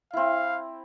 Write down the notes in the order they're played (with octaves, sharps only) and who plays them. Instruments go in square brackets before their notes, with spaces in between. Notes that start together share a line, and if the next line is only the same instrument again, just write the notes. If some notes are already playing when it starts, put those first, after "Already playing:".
[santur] C4 E4 [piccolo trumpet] F5